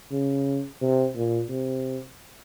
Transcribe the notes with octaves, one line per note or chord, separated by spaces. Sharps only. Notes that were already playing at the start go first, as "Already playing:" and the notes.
C#3
C3
A#2
C3